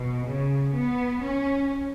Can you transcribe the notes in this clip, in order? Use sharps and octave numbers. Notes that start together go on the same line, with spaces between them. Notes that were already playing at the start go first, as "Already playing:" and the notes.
Already playing: B2
C#3
B3
C#4